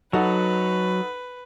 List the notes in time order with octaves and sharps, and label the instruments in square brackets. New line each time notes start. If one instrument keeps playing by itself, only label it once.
[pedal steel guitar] F#3 [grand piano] D#4 A4 F#5 [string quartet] B4